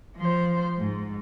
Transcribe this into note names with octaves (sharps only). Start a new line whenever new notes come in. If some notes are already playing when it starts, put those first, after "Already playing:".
F3 C5
G#2